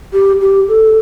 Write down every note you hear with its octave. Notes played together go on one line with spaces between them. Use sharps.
G4
G4
A4